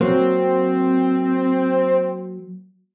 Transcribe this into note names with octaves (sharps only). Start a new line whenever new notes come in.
F#3 A#3 C4